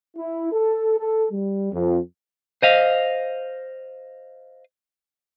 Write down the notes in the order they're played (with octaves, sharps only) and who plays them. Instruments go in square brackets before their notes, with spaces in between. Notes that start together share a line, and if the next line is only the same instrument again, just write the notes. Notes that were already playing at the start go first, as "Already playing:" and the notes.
[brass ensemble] E4
A4
A4
G3
F2
[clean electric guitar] C5 D#5 F5